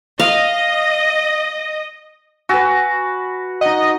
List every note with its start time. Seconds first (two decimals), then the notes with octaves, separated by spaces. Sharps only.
0.19 D#5 F5
2.49 F#4 B4 G#5 E6 A6
3.61 D#4 D#5 F#5